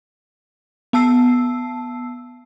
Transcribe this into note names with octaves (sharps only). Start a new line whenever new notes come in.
B3 A5 E6 C7